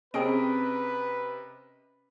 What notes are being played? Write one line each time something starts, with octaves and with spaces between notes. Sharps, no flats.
C3 C4 C#4 G#4 A#4 B4 D#5 D7